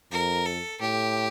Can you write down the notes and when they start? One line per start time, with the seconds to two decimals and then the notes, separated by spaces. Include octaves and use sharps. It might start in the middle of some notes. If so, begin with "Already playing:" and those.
0.12 F2 A#4
0.46 A4
0.80 A2 G4